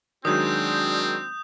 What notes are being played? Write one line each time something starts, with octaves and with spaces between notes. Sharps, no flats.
D#3 F#3 G#3 C4 D4 F#4 D#6 G6